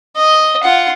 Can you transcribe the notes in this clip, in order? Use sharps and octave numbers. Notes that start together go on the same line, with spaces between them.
D#5
F4 F#5